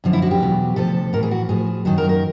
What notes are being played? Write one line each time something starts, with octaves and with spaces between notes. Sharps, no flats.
F#2 D3 F3
E4
F#4
G4
E2 B2 F#3
D2 C3 F3 A4
A2 E3 A#4
G#4
F#4
A2 F3 G#4
F#2 D#3 F#3 A4
A#4
A#4